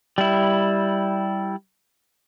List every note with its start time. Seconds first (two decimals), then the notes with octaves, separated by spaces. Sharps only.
0.18 G3 E4